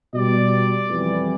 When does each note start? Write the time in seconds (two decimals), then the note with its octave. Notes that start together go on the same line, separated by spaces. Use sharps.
0.14 B2 G3 D5
0.90 F2 E3 G3